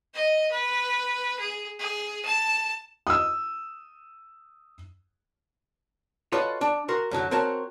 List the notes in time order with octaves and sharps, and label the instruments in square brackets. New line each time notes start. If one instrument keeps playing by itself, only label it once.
[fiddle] D#5
B4
G#4
G#4
A5
[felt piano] D#6 E6
[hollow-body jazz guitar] F4 F#4 A4 B4 C#5 D#5
D4
F#4 A#4 C6
F#2 D3 F#3
C4 F#4 A#4 C#5 A5